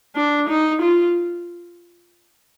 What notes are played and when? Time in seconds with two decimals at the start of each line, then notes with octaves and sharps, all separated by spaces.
0.16 D4
0.49 D#4
0.82 F4